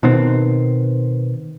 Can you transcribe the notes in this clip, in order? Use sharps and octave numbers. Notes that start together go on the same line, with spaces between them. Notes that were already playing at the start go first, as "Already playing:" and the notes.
B2 D#3 B3 C4